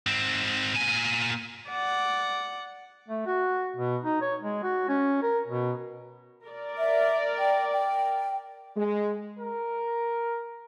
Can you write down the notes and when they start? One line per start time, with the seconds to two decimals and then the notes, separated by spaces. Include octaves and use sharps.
0.07 G#2 C4
0.75 A#2 G#5
1.70 D5 F#5
3.08 A3
3.26 F#4
3.76 B2
4.03 D#4
4.21 C#5
4.42 G#3
4.63 F#4
4.88 C#4
5.22 A#4
5.47 B2
6.46 A#4 D5
6.78 E5
7.39 G5
7.72 G5
8.77 G#3
9.40 A#4